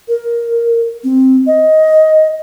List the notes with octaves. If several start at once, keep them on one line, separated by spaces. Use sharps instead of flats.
A#4
C4
D#5